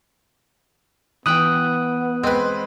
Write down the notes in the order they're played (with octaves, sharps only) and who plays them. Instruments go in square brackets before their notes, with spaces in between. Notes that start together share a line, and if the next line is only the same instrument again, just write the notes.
[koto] E3 G5 [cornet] B3 [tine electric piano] D#6 F#6
[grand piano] G#3 B4 [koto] C4